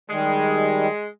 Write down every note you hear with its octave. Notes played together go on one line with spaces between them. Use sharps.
D#3 G3 G#3